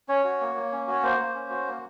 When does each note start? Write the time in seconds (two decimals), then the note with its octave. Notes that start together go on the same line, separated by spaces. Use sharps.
0.09 C#4 C#5
0.24 F#4
0.41 A#3
0.55 A#3
0.72 C#4
0.87 F#4 C#5
1.03 A#3 C5
1.19 A#3
1.34 C#4
1.50 F#4
1.67 A#3